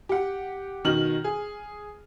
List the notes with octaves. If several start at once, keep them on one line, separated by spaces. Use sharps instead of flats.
G4 F#5
B2 D#3 F6 F#7
G#4